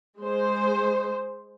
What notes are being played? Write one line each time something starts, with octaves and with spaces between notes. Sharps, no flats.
G#3 C5